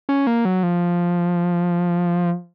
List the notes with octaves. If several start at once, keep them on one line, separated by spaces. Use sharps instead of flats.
C#4
A#3
F#3
F3